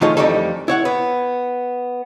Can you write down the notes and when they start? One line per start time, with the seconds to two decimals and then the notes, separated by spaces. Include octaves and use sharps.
0.01 D#3 A3 D#4 F4 G#4 C#5
0.17 F2 E3 G3 A3 D#4 A4
0.68 E4 C#5 F#5
0.85 B3